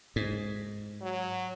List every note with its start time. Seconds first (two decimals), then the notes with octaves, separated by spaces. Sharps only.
0.16 G#2
1.02 F#3